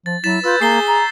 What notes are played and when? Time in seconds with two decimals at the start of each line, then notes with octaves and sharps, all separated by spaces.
0.06 F3 A6
0.24 F#3 E4 A6 B6 E7
0.44 F4 B4 E6 G6
0.60 A#3 G#4 C#6 C7 G7
0.87 A#5